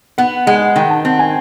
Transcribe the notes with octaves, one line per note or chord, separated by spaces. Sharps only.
B3 F#5
G#3 F#5
D#3 G5
A5
C4
G#5